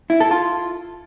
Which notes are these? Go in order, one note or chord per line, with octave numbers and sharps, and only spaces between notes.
E4
A4
F4